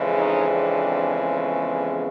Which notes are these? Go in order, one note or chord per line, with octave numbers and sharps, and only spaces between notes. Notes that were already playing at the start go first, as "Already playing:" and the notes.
Already playing: F2 C#3 E3 G#3
C#4 D#4
C4 D4
B3 C#4